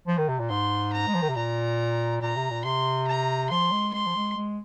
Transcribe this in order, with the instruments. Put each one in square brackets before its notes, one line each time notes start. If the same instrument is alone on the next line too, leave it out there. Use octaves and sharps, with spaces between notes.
[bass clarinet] F3
D#3
C3
A#2
[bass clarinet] G#2 [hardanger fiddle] C6
[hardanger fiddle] A#5
[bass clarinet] G#3
F3
D#3
C3
[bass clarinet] A#2 [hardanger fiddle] A#5
[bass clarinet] A#2 [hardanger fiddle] A#5
[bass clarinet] C3
A#2
[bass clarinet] C3 [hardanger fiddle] C6
[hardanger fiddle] A#5
[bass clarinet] F3 [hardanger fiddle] C6
[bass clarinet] G#3
[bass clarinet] G#3 [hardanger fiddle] C6
[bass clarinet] F3
G#3
G#3